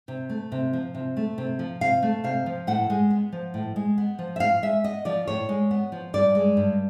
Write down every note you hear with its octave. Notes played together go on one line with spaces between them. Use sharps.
C3
A3
C3
F3
C3
A3
C3
F3
C3 F5
A3
C3 F5
F3
A2 F#5
G#3
B3
F3
A2
G#3
B3
F3
E5
A2 F5
G#3 E5
B3 D#5
F3 D5
A2 C#5
G#3
B3
F3
G2 D5
G#3
G2